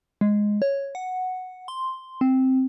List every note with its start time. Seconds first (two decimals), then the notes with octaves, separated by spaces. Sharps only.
0.21 G#3
0.62 C#5
0.95 F#5
1.68 C6
2.21 C4